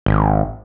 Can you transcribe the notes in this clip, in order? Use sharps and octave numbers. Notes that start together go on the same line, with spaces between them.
G#1